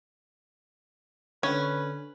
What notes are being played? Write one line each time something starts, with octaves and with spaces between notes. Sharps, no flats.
D3 C#4 B4